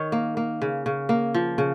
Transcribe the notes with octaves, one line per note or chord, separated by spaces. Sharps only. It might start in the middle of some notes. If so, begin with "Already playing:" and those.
Already playing: D#3 C#5
A#3
A#3
C#3
C#3
A#3
F3
C#3